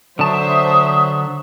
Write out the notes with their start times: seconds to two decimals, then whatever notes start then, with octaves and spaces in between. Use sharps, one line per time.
0.19 D3 F#3 C5 E5 A5 D#6